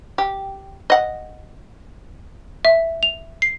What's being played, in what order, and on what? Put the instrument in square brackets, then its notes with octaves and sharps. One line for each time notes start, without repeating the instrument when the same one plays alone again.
[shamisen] G4
D#5 F#5
[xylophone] E5
F7
C7